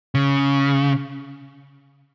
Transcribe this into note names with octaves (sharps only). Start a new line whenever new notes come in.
C#3